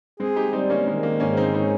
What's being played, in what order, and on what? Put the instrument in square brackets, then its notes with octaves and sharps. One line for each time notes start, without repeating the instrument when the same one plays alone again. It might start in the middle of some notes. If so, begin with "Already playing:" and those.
[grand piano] G#3 C4 [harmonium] G#4
[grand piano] D#4 G4
[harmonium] G3 [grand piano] C4 D#4
[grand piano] A#3 C#4
[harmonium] D#3 [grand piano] G#3
[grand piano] A#3
[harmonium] G#2 [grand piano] A#3 C#4
[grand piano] C4 D#4
[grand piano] C4 D#4 [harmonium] C#4